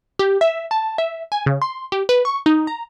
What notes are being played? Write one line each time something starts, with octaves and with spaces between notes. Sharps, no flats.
G4
E5
A5
E5
G#5
C#3
C6
G4
B4
C#6
D#4
A#5